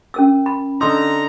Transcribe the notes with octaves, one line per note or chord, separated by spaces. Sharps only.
C#4 A#4 E6
B5
D3 D#4 A#5 C6 D#6 E6